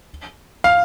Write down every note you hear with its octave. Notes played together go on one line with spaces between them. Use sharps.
F5